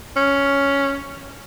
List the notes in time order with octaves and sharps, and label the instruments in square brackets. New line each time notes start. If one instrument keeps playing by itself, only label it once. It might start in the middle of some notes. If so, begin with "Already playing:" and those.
[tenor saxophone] C#4